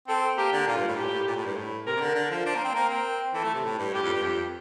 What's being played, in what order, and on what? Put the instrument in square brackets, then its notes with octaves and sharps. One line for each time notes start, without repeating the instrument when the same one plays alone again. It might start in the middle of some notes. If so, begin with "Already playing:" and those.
[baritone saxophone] C4 [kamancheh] A4
[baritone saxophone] A#3 [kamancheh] G4
[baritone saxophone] D3
[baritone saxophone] A#2 [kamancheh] F4
[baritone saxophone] G2
A2
[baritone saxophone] A#2 [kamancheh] G4
[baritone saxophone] A2
A#2
A2
G2
A2
[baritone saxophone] C3 [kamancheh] A#4
[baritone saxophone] C3
D3
[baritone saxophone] D3 [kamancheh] A#4
[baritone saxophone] F3
[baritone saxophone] D4 [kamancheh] C5
[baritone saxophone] A#3
C4
[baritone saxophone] A#3 [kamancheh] A#4
[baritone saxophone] C4
[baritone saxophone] E3 [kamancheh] A4
[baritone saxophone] A3
C3
A2
G2
[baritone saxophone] A2 [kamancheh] G4
[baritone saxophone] F2
G2
F2